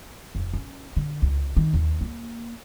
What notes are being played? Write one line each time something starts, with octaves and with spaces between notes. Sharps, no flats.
F1
C#4
D3
C#2
D#3
D#2
A#3